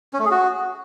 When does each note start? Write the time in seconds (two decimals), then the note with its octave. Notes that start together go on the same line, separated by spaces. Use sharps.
0.13 C#4
0.19 A3
0.25 G#4
0.31 F#4